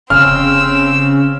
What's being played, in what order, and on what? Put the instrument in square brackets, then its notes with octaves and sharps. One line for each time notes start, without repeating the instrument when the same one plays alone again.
[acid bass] F1 [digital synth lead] C#3 [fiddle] C4 E6 [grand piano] F6